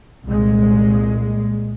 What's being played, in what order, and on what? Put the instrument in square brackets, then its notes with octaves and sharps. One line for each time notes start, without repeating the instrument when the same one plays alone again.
[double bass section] C2 A#2 G#3